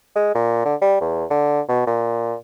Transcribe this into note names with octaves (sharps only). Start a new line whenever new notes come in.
G#3
A#2
D3
G3
E2
D3
B2
A#2